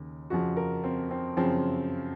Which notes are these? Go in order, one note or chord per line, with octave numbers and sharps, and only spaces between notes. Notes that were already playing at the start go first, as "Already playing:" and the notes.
Already playing: D#2 C#3
F2 C#3 F3 F#4
A#4
C4
C4
F#2 C#3 F3 C4